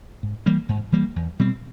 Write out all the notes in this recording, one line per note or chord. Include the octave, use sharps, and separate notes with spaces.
G#2
E3 G3 A#3
G#2
E3 G3 A#3
E2
B2 G3 C4